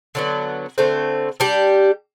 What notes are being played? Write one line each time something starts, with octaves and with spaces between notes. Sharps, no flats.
D3 F#3 B3
D3 A3 C4
G3 D4 G4